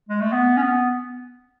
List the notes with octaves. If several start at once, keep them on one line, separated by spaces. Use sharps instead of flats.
G#3
A3
B3
C#4
B3